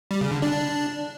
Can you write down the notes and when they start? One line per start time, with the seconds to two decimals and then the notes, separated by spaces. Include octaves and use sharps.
0.11 G3
0.21 C#3
0.32 D3
0.42 D4